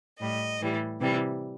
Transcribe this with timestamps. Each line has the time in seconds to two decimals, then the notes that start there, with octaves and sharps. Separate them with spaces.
0.20 A2 G3 D#5
0.60 A2 E3 G3
1.01 C3 E3 G3